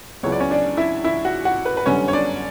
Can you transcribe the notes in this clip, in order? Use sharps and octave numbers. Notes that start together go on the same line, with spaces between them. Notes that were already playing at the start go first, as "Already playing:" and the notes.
C#2 C#3 F#3 B3 E4 C#5
D5
C#4 C#5
D4 D5
E4 E5
E4 E5
F#4 F#5
F#4 F#5
B4
B4
G1 F#2 D3 G3 B3 C#4 C#5
C#5
D4 D5